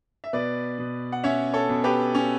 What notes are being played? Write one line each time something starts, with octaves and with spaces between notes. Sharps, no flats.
E5
B2 B4 D5
B2
F#5
C#4 C#5 E5
A4 C#5
B2
G4 B4
C#4